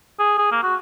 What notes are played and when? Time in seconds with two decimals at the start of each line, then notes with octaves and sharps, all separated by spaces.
0.19 G#4
0.38 G#4
0.52 A#3
0.63 F#4